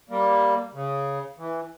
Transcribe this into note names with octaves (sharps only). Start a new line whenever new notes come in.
G3 A#3
C#3
E3